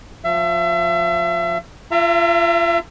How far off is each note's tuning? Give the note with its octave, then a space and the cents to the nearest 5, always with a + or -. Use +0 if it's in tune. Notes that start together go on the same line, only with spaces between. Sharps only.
F3 +20 E5 +35
F4 -25 E5 +35 A#5 -30